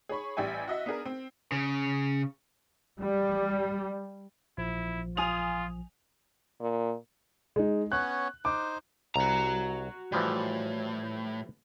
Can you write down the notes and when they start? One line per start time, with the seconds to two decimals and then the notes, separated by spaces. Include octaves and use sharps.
0.09 G#4 C#5 B5 C#6
0.37 A1 G3 G4 E5 G#5
0.68 F#4 D#5 E5
0.86 B3 D4 G#4 A#4
1.05 C4
1.52 C#3
2.99 G3
4.58 A#1 F3 E4
5.17 F4 G#5 D#6 F7
6.60 A#2
7.56 G#3 D#4
7.92 B3 C#4 C#5 F#6
8.45 D#4 C5 D6
9.16 C2 F#4 A#5
10.12 A2 E3 F3 G3